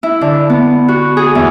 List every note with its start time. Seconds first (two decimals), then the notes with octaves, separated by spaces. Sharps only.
0.03 E4
0.21 D3
0.50 B3
0.88 F#4
1.17 G#4
1.35 E2